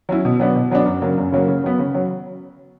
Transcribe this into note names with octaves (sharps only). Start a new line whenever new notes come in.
F#3 C#4 E4
B2
F#3 B3 D4
B2
F#3 B3 D4
F#2
C#3 F#3 A#3
F#2
C#3 F#3 A#3
C#3
F#3 B3
C#3
F#3